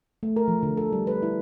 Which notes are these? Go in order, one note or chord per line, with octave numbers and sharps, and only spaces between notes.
A3
A#4
F3
D3
A4
G3
B4
E4